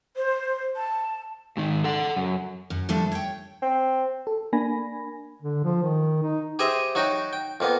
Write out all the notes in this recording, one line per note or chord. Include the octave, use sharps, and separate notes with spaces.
C5
A5
G#2 D#3
A4 F#5
F#2
F#2
F3 G3 A3 D4 A4
C#5 G5
C4
A4
A#3 D4 G#5 B5 A#6
D3
F3
D#3
D#4
G4 G#4 C5 D#5 E5
F#3 D#4 F#4 G5
G5
F2 A#3 B3